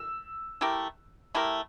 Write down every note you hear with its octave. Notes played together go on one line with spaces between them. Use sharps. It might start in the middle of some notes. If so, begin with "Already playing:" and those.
Already playing: E6
A3 E4 G4 A#4
A3 E4 G4 A#4